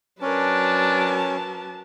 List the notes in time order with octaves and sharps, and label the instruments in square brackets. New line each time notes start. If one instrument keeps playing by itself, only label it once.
[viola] F#3 A5 [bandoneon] C#4 [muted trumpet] D4 [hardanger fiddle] A#4 B4